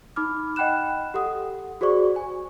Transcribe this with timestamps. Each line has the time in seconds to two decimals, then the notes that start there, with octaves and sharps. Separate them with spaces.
0.16 D#4 B5 D6 F6
0.56 D#5 F#5 G5 B5 F#6 E7
1.14 G4 A4 F#5 D#6
1.81 F#4 G#4 C5 D5 C#6
2.16 G#5